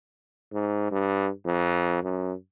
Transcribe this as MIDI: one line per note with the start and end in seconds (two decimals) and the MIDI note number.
0.53 0.89 44
0.91 1.30 43
1.45 1.99 41
2.03 2.33 42